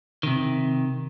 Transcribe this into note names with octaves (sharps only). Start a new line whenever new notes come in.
C3 D#3